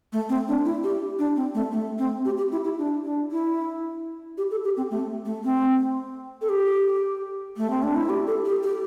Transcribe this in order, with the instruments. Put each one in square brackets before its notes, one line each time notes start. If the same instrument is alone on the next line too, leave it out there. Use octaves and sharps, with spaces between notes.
[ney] A3
C4
D4
E4
G4
D4
C4
A3
A3
C4
G4
G4
E4
E4
D4
D4
E4
G4
A4
G4
C4
A3
A3
C4
A4
G4
A3
C4
D4
E4
G4
A4
G4
G4